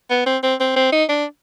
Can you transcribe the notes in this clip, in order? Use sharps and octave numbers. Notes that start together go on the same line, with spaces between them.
B3
C4
C4
C4
C4
D#4
D4